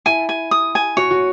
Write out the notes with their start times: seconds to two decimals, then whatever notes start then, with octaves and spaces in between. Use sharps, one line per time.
0.06 E4 G#5
0.29 G#5
0.51 D#6
0.75 G#5
0.97 F#4 C#5
1.11 F#4